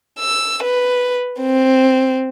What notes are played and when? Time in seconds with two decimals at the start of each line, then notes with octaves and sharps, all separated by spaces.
0.19 E6
0.63 B4
1.40 C4